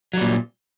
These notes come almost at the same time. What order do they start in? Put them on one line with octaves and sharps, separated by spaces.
F#3 G3 A#2